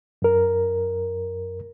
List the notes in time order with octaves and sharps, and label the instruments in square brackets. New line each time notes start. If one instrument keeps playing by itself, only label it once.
[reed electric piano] F#2 A#4